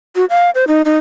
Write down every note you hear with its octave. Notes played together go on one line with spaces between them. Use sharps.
F#4
F5
C5
D#4
D#4